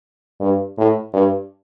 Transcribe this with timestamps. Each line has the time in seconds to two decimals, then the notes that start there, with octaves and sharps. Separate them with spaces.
0.40 G2
0.78 A2
1.14 G2